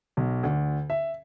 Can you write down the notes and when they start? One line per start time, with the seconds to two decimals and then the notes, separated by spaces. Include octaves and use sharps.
0.17 B1
0.43 D2
0.90 E5